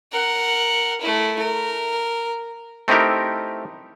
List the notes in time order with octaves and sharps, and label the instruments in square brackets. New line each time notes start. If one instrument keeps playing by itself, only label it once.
[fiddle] A#4 F#5
A3 E4
A#4
[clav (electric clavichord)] A3 C4 D#4 E4 G4 A#4